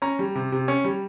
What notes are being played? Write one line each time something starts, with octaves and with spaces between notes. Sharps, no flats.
C#4 A#5
G3
C3
C3
C#4
G3